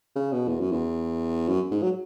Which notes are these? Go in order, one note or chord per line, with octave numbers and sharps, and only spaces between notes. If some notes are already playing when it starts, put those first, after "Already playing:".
C#3
B2
E2
F#2
E2
F#2
G#2
F#3